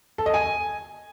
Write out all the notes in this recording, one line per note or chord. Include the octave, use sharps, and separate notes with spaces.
A4
D#5
G#5